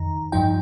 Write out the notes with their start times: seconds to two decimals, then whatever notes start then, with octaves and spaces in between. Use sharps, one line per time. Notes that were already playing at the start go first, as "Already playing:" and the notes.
Already playing: F2 D#3 D#4 A#5
0.32 G2 F3 D#4 G5